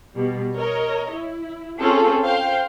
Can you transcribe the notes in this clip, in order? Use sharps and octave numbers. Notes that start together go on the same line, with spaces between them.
B2 G3
A#4 C#5 D#5
E4
C4 C#4 F4 G#4 A4
C5 F5 G5